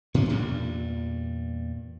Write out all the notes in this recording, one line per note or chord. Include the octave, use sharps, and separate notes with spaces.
A2 C#4 D4
E2 G2 A#2